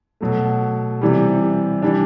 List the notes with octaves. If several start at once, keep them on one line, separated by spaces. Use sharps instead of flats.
B2 F#3 A3
C3 E3 G3
E3 G3 D4